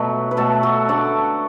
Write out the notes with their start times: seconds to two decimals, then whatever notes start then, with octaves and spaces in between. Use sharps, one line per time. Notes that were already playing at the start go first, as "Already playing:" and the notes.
Already playing: B2 F#3 A3 A4
0.31 B4
0.37 B2 F#3 A3 F#4 A4
0.63 F#4 A4
0.89 D3 A3 D5 F#5